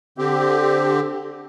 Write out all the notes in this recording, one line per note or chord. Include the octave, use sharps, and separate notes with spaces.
D3 C4 G4